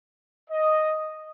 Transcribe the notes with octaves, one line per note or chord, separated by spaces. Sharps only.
D#5